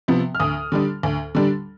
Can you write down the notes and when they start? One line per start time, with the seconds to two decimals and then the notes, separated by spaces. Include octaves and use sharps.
0.08 C3 F3 B3
0.35 F6
0.40 D2 D#6
0.72 D3 G3 D4
1.03 D2
1.35 D3 G3 D4